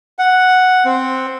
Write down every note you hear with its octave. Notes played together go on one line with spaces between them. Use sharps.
F#5
C4